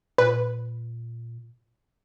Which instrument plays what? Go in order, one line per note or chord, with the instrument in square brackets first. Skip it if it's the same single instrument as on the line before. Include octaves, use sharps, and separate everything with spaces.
[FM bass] A#2 [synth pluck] B4